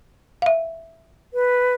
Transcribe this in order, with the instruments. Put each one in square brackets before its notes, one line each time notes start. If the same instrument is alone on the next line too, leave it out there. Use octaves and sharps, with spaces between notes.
[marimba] E5 F5
[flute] B4